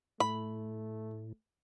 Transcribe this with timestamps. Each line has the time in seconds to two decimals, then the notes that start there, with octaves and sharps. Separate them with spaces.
0.20 A2 A3 B5